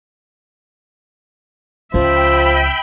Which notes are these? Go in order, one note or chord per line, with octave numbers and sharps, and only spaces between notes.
C#2 F3 E5 G5 B5